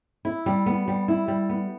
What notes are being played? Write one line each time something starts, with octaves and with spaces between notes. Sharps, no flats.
E4
G3
B3
G3
E4
G3
B3